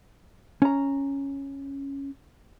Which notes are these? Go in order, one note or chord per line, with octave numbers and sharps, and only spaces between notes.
C#4 A#5